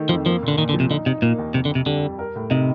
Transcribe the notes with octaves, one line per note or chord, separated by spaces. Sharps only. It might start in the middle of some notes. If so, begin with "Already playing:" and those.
Already playing: D#3 A3 D#4
F2 F3
F3 A#3
A#2
D3
A#2 D#3
D3
F3
C3
D3 D#4
C3 D#4
A#2 A#3
D#2
F2 C3
D3
F2 C3
D3 G3
G3
A#4
A2
C3 D#4